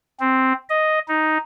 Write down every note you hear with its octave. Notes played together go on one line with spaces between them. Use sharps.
C4
D#5
D#4